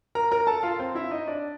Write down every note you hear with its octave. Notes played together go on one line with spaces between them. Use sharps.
A#4 A#5
A#4 A#5
A4 A5
F4 F5
C4 C5
E4 E5
D#4 D#5
D4 D5